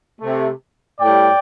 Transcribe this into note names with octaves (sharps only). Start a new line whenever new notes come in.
C3 A3
A2 G3 D5 G5